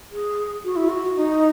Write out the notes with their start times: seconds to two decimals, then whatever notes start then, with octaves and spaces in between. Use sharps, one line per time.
0.12 G#4
0.65 F#4
0.76 E4
0.89 F#4
1.16 D#4